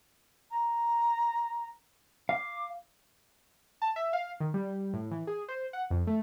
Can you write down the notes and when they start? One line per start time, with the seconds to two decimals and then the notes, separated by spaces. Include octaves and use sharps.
0.50 A#5
2.29 F5 D6
3.82 A5
3.96 E5
4.13 F5
4.40 D#3
4.54 G3
4.94 A2
5.11 E3
5.27 G#4
5.48 C5
5.73 F#5
5.90 F2
6.07 A3